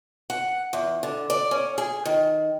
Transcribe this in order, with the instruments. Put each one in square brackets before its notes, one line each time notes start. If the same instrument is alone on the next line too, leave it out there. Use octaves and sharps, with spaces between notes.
[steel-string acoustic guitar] F#5
E2
D3
D5
C#4
G#4
D#3